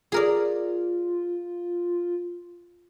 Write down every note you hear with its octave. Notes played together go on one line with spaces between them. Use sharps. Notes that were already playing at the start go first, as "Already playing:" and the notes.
F4 G#4 A#4 D5